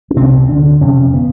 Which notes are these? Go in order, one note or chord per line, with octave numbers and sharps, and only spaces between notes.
C#4
C2 C3 C4
D2 D3 D4
F2 C3 C#4
C#3 B3